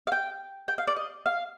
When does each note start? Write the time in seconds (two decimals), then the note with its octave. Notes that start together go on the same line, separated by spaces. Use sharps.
0.07 F5
0.12 G5
0.68 G5
0.78 F5
0.87 D5
0.96 D#5
1.26 F5